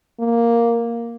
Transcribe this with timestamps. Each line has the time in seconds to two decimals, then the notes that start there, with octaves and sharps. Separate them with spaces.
0.20 A#3